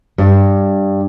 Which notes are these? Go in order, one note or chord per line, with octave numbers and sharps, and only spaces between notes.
G2